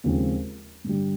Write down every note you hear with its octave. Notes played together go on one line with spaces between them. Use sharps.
D#2 C#3 F3 G#3 C4
G2 D3 G3